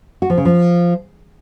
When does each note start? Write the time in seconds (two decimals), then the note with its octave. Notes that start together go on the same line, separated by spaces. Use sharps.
0.22 F#4
0.30 F3
0.38 C#3
0.45 F3